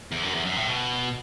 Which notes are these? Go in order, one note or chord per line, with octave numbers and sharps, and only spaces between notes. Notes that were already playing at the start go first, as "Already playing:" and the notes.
E2
F#2
E2
F#2
A2
B2